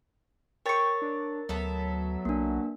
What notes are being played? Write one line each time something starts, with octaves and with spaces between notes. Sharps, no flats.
A#4 C#5 G5 C#6 A6
D4
D2 F#3 B3 A4 E5
B1 A#3 D4